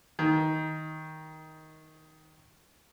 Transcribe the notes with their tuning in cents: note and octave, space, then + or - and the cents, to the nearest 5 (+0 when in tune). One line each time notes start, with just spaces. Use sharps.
D#3 +10